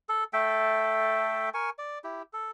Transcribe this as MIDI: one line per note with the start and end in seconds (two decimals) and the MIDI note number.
0.09 0.24 69
0.33 1.50 57
0.33 1.50 69
0.33 1.50 76
0.33 1.50 79
1.54 1.70 70
1.54 1.70 80
1.54 1.70 85
1.78 1.99 74
2.04 2.22 64
2.04 2.22 67
2.33 2.51 69